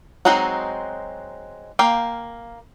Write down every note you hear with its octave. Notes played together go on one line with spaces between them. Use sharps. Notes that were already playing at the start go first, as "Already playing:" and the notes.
F#3 G#3 C4 D#4 F#4
A#3 F5 G5